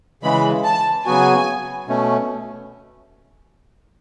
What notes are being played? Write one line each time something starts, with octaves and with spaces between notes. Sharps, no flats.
C#3 E3 G#3 B5
A5
C#3 F#3 B3 F#4 G#5
B2 A3 C#4